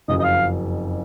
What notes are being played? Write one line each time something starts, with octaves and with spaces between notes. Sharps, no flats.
F#1 F2 C#3 F#3 D#5
D#5
F5